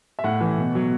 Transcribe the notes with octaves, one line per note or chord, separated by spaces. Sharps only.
E5
A2 F#5
E3
B2
F#3